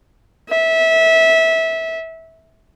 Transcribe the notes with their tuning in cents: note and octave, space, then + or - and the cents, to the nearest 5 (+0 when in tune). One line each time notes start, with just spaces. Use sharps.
E5 -20